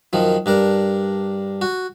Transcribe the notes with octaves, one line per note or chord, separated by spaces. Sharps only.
F#2 D#3 F3
G2 D4 A#4
F#4